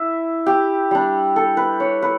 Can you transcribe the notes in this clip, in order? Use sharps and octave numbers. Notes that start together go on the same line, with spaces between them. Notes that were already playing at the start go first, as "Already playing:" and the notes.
Already playing: E4 E5
G4
G3 D4
A4
B4
C#5
B4